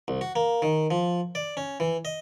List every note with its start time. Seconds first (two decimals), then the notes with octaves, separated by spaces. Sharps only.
0.08 C2
0.21 F#4
0.36 A#3
0.62 D#3
0.91 F3
1.35 D5
1.57 C#4
1.80 E3
2.05 D#5